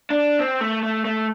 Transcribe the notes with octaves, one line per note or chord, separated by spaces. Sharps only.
D4
C4
A3
A3
A3